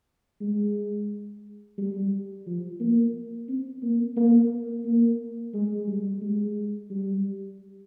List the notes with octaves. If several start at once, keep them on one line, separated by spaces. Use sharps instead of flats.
G#3
G3
F3
A#3
C4
A#3
A#3
A#3
G#3
G3
G#3
G3